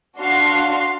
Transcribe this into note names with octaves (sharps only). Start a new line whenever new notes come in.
D4 F#4 F5 C6 C7